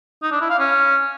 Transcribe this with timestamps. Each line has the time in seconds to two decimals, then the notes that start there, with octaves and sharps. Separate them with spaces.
0.23 D#4
0.32 D4
0.41 E4
0.50 F5
0.59 C#4